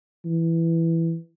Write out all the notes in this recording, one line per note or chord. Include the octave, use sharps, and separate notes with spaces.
E3